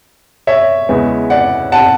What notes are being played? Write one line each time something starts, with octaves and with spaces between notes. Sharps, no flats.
C#5 E5
E2 C#3 G#3 B3
D5 F#5
F#5 A5